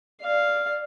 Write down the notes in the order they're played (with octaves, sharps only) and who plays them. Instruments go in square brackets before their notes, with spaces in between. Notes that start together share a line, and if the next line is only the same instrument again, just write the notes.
[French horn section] D5 [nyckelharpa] F5